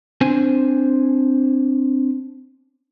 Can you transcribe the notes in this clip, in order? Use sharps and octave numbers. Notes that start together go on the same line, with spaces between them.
C4 D4 C5 G#5